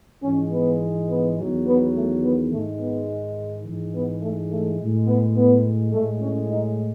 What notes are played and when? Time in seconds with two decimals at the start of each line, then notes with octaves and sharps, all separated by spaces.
0.23 G#2 E3 G#3 C#4
0.52 B3
1.09 B3
1.38 E2 D#3 F#3
1.66 B3
1.95 A3
2.23 B3
2.51 G#2 D#3 G#3 A3
2.79 B3
3.65 G#2 E3 G#3
3.94 B3
4.21 A3
4.50 A3
4.79 A2 G#3
5.07 B3
5.36 B3
5.92 G#3 A3
5.97 A2
6.21 C#4
6.50 D#4